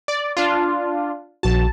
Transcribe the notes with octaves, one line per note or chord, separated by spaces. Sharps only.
D5
D4 F4
A#1 F#4 A5